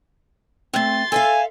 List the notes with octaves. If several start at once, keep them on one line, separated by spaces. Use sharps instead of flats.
A3 C4 C6 A6
A4 E5 F5 G#5